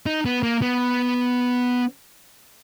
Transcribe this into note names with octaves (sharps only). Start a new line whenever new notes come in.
D#4
B3
A#3
B3